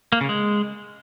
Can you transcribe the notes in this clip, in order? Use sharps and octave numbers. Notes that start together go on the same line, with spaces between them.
A#3
C#3
G#3